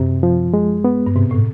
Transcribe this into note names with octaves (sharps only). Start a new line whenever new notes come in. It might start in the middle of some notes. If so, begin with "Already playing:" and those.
Already playing: F#2 C3
F3
G#3
B3
G2
G#2 C3
A2